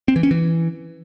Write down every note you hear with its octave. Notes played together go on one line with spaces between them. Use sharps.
C4
E3
C#4
E3